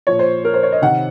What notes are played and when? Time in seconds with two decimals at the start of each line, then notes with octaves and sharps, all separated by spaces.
0.07 A#2 F3 C#5
0.19 C5
0.45 A#4
0.54 C5
0.63 C#5
0.72 D#5
0.82 C3 D#3 F#5